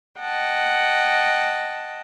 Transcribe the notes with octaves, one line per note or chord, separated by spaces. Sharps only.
D#5 F#5 G5 A5